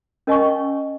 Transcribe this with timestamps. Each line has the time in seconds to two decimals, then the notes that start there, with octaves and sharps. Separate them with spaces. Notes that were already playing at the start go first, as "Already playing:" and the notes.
0.27 C#4 A#4 D#5 G#5 C#6